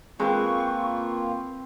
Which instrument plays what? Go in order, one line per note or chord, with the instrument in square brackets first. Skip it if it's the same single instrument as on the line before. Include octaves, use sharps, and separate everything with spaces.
[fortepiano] G#3 [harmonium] A#3 F4 [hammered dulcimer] C4 B4 C5 [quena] C#6